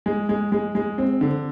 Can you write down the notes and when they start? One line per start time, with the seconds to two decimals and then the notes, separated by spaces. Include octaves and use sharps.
0.06 G#3
0.29 G#3
0.52 G#3
0.75 G#3
0.98 C4
1.21 D3